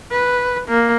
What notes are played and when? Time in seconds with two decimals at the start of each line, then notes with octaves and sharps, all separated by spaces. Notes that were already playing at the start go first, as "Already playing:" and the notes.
0.12 B4
0.68 A#3